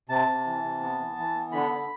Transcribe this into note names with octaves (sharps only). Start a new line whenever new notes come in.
C3 A5
C3
E3
C3
B3
E3
E3
B3
D3 B5
D3